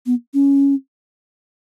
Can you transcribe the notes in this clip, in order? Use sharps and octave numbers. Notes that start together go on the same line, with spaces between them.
B3
C#4